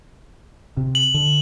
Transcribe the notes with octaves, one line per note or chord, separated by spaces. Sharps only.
C3
F#7
D3